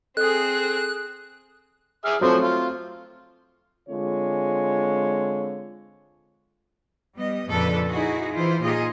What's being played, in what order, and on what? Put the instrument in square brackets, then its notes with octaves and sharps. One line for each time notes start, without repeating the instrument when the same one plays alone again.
[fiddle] C4 G#4 [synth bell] A4 D#6 [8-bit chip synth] F#6
[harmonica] G#4 E5 F6
[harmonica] F3 C5 [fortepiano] F#3 A3 C4
[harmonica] F4
[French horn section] D3 G#3 C4 F4 C#5
[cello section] G3 B3 D#5
F2 A#2 C#3 D4 A4 B4
D#4 E4 F#4 G#4
E3 E4 F4 C5
A#2 D#4 F4 G#4 D#5